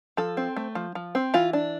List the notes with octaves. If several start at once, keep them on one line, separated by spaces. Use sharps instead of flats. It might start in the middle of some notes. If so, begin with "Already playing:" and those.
F3 A4
C4
A3
F3
F3
C4
E3 F4
D4